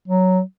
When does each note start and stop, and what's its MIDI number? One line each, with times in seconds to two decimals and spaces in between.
0.08 0.41 54